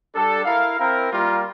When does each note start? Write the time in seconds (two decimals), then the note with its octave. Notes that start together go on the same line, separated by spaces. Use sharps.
0.14 G3 D4 A4
0.45 E4 A#4 F5
0.78 C4 E4 A#4
1.10 G3 A#3 F4 A#4